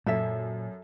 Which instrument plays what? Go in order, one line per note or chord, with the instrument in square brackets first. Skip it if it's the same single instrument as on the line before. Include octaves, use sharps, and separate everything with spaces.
[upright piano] F#2 [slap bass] A#2 [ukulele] A4 E5